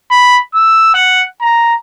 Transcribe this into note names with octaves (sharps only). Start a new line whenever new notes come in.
B5
E6
F#5
A#5